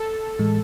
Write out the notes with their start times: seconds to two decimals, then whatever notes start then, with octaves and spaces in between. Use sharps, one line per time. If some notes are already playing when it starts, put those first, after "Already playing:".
Already playing: A4
0.39 A2 E3 G#3